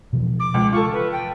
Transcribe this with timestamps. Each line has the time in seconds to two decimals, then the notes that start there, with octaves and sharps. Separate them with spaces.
0.13 B2 E3 F3
0.39 D6
0.54 C#2
0.72 F4 A4 C#6
0.92 B4
1.12 G5